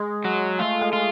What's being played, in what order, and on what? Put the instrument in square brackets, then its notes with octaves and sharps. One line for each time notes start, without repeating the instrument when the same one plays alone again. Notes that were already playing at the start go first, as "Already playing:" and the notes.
Already playing: [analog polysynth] G#3
[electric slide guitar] F#3
[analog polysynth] A3 [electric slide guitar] F4
[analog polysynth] G#3
[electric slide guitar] F4